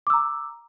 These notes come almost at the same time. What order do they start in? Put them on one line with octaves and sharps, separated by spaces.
D6 E6 A#5